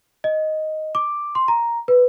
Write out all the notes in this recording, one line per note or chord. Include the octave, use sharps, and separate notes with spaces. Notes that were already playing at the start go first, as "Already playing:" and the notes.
D#5
D6
C6
A#5
B4